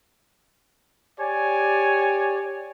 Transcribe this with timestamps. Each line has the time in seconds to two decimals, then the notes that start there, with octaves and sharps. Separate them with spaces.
1.20 G4 C#5 D5 G#5